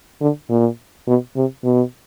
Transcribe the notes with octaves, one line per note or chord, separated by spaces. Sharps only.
D3
A#2
B2
C3
B2